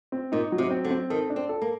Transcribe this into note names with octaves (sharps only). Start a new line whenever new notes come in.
C4
A#2 D#4
F#3
C3
C4
D3
C4
D#3 A4
D4
C4
A4
A#3